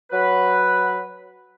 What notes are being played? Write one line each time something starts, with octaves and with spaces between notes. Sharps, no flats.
F#3 B4